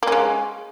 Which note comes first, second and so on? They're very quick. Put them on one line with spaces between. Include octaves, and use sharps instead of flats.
A#3 C#4 G#3